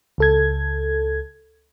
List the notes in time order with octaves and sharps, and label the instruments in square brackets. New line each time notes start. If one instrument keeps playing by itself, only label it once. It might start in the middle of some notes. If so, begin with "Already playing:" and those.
[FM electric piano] C#2 A4 G#6